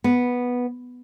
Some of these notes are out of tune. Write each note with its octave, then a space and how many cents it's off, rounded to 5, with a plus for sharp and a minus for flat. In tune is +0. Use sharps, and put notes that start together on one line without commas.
B3 -5